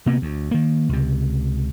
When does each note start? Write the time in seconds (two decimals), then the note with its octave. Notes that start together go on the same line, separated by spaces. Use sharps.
0.06 C3 A#3 B3
0.22 D2
0.51 D#3 A#3
0.89 C#2 C3